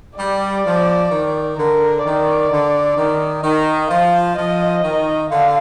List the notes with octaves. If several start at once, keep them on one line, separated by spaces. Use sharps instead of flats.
G3 D5
F3
D#3
D3 A#4
D#3 D5
D3
D#3
D#3 D#5
F3 F5
F3 D#5
D#3
D3 F5